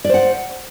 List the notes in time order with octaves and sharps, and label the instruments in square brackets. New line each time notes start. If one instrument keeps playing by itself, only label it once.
[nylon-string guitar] D5
C5
F#5